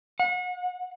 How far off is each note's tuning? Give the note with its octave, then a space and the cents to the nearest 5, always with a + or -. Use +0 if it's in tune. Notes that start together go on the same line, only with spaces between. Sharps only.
F#5 -35